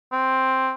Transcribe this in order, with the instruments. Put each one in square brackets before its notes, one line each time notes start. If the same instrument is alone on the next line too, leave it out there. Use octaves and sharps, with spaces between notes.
[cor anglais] C4